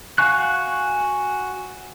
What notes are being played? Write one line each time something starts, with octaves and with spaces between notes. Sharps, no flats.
F#4 F5 G#5 C#6 F#6